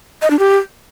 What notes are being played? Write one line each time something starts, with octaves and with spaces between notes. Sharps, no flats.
D#5
D4
G4